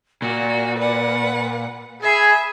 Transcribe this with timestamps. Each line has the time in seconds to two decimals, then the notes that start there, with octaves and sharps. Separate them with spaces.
0.22 A#2 F#4 D5
0.79 B4 F#5
2.02 G#4 E5 G#5 B5